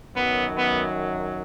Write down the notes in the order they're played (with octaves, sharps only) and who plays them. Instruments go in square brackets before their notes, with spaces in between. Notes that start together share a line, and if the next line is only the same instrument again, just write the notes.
[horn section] F#2 D#3 F#3 B3
B3